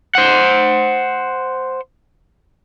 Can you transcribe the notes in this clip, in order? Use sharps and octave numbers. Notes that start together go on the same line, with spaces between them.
C5 F#5